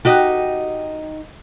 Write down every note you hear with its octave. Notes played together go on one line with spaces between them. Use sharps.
D#4 F#4 G4